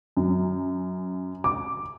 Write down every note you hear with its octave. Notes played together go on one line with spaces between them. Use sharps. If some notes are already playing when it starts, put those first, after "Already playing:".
F#2
D6